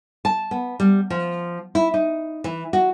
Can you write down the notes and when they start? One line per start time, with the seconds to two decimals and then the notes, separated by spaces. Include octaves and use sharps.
0.25 A5
0.51 B3
0.80 G3
1.10 F3
1.75 E4
1.94 D#4
2.44 E3
2.73 F#4